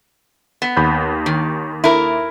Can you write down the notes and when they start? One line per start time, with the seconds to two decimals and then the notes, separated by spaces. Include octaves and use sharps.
0.62 B3
0.77 D#2 B5 G6
1.26 D#3
1.84 E4 A#4